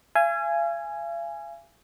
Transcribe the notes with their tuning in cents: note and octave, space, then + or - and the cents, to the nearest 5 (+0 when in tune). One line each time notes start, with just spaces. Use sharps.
F5 -45 G#5 +0